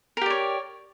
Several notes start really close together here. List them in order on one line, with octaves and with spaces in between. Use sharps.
A#4 G4 D5 C#5